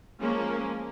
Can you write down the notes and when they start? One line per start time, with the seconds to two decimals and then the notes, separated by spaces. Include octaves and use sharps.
0.21 F3 G#3 A#3 C#4